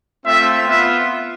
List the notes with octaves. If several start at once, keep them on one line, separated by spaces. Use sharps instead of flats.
A3 C4 F4 E5
B3 F4 E5